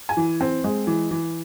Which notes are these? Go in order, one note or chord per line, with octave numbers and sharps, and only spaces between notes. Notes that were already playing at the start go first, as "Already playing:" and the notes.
G#5
E3
C4
G#3
E3
E3